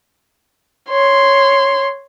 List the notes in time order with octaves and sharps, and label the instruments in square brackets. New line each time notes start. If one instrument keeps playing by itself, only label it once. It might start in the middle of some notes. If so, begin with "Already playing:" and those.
[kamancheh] C#5 C6